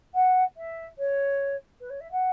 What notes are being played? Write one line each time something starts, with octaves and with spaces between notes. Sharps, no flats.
F#5
E5
C#5
B4
C#5
E5
F#5